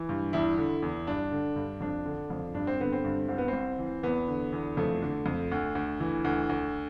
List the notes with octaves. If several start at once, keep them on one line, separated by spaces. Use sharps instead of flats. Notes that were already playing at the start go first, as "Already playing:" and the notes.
Already playing: E3
G2
E2 E4
D3
E2
G2 D4
D3
G2
F2 D4
D3
F2
G2 D4
C4
D3 B3
C4
G2
C2 C4
B3
C4
C2
E3
E2 B3
D3
E2
F2 A3
D3
F2
D2
D2
E3
D2
D2